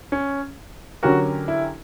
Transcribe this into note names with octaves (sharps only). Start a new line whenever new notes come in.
C#4
D3 F#3 C#4 F#4 G4 A#4
E4